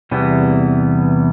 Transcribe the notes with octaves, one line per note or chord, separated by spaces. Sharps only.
E2 C3 E3 G3 B3